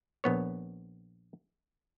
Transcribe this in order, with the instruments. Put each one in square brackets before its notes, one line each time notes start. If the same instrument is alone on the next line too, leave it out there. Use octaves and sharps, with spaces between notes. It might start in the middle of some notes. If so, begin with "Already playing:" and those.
[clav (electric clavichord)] A#1 B3 C#5